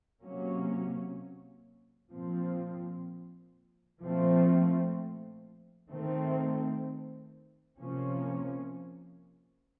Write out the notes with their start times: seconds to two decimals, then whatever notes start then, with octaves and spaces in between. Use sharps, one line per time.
0.22 C3 F#3 A#3 C#4
2.11 A#2 F3 C4
4.00 A#2 F3 A3 C4
5.89 D#3 A3 C4
7.78 C3 F3 A#3 C#4